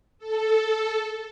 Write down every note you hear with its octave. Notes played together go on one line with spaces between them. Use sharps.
A4